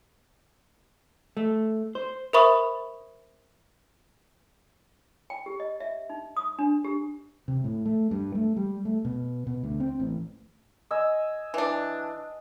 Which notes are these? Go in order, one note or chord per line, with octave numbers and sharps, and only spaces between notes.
A3
C5
A#4 C5 E5 B5 C#6 D#6
G5
G4
D#5
E5
D#4
D#6
D4
G4
C3
A2
A3
G2
A3
G3
A3
B2
B2
D2
C4
A1
D#5 G#5 E6
E3 D4